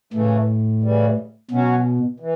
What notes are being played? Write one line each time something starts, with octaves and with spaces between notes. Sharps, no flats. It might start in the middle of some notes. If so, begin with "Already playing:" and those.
A2 C#3 E3 A3
C#3 E3 G3
B2 F#3 C#4 F#4
E3